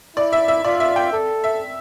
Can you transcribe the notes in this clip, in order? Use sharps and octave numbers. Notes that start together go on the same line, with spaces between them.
E4 D5
E5
E5
F4 D5
E5
G5
A4
E5